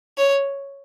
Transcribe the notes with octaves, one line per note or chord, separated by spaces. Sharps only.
C#5